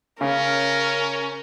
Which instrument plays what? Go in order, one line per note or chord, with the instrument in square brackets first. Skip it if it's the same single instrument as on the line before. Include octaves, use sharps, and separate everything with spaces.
[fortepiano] C#3 [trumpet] C#4 [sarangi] A#4